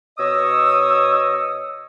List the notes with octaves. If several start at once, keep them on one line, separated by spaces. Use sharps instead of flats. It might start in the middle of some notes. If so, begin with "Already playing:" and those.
B2 C#5 D#5 D#6 E6